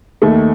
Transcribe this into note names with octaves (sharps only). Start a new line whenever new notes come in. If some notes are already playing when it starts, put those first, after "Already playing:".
D#2 D#3 A3